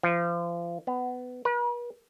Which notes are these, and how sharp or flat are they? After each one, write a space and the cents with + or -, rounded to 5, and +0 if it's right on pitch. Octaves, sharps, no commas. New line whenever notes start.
F3 -30
B3 +20
B4 -45